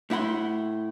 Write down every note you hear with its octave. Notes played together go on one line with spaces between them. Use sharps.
A2 E4 F#5 B5 C6